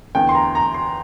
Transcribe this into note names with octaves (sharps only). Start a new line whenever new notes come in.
E2 D3 G5
C6
A#5
A#5
C6